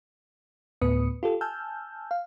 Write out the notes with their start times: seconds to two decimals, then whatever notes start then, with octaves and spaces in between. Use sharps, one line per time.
0.81 D2 A2 B3 B4 D#6 C#7
1.23 F4 G4 A4
1.41 G#5 A5 E6 F6 G6
2.11 F5